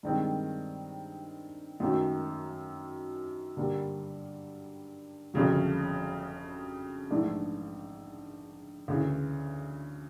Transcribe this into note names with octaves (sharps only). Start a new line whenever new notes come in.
G2 D#3 G#3 C4
F#2 D#3 F#3 A3
G2 D3 G3 A#3
G1 F2 C#3 F#3
A#1 G#2 E3 A3 D4
D2 C#3 E3